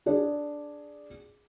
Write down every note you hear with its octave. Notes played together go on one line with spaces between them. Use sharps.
D4 G#4 D5